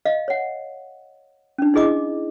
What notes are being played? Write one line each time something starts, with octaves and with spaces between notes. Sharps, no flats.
D#5 F5
C#5 F#5
C#4 D4
D#4 E4 G#4 D#5 D6